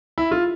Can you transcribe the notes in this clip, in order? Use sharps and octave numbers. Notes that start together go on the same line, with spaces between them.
E4
F4